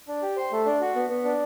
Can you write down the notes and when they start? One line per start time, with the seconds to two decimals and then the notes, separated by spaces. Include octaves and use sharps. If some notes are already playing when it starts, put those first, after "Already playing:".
0.08 D4
0.22 G4
0.37 C5
0.52 A3
0.66 D4
0.81 F#4
0.95 B3
1.10 B3
1.25 D4